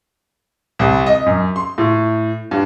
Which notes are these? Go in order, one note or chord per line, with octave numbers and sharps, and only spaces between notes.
C2
D#5
F#2
C6
A2
G2